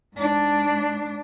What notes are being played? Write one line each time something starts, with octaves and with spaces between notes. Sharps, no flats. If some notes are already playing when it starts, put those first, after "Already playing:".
G#2 D4